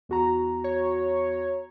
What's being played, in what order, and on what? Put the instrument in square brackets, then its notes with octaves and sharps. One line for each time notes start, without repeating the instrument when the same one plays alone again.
[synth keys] E2 F#4 A#5
[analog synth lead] C#5